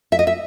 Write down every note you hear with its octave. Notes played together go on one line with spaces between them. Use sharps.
E5
D#5
E5